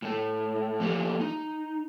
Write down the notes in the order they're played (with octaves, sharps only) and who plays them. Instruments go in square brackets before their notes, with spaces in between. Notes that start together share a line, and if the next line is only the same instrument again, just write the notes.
[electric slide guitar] A2 A3
F3 A3 A#3 G4 A4
D#4